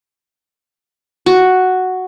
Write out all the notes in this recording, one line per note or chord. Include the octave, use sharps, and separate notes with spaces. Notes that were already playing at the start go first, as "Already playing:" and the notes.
F#4